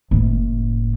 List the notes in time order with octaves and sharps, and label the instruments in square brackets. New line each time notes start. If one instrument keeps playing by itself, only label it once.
[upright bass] F#1 A2